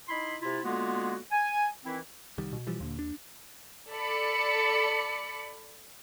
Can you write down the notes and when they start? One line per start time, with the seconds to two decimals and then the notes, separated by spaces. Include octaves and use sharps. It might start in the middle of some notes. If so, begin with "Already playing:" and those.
0.08 D#4 E4 B5 C6
0.40 C3 E4 F4
0.64 D3 G#3 A#3 B3 F4 F#4
1.32 G#5
1.85 D#3 E3 C4 E4
2.38 C2 D#3 G3
2.53 B2
2.67 E3 F3 G3
2.80 D#2 A#2 D3
2.99 D4
3.92 A4 D5 B5 C#7